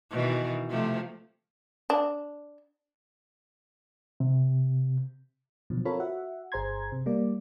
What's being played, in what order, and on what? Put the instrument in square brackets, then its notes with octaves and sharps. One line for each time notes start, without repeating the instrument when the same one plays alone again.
[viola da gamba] B2 D#3 E3
C3 F3 A3
[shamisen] D4
[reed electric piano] C3
[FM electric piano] B2 D3 F3 F#3
C4 F4 A4 A#4 C#5 B5
F#4 E5 F#5
G1 G#4 C5 A#5 C6 G#6
C3
G3 A#3 D5